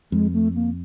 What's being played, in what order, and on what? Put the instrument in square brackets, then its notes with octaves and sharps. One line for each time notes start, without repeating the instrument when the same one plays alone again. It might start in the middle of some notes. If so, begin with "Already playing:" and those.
[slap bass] F2 [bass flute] G#3
[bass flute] A3
A#3